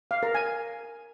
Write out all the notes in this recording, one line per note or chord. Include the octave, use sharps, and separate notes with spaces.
F5
A#4
G#5